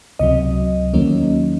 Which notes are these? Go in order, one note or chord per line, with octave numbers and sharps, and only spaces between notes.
C#2 C3 F#3 D#5
D#2 D#3 F#3 A#3 C#4